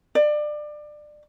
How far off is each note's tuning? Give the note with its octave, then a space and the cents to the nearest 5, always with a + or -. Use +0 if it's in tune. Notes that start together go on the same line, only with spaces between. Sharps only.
D5 +25